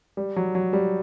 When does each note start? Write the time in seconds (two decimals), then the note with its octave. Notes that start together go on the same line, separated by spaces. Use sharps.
0.17 G3
0.36 F#3
0.55 F#3
0.73 G3